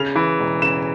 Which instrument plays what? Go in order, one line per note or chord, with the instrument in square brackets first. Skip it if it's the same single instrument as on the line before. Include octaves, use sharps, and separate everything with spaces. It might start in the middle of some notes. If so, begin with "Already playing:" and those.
Already playing: [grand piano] C#3 F7
E3
E1
C#3 E7